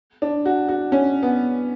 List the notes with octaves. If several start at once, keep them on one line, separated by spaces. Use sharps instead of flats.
D4
F#4
F#4
C#4
B3